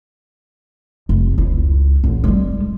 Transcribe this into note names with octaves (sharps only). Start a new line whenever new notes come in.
F1
C#2 E4
A1 D3
G3 G#3